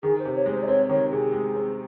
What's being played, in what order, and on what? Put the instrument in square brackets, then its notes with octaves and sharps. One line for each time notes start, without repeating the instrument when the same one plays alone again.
[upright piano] D#3 [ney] G#4
[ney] C5
[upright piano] C3
[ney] C#5
[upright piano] G#3
[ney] C5
D#5
[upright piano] C4 [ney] C#5
[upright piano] D#3 [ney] C#5
[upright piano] C3 [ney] G#4
[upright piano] G#3
C4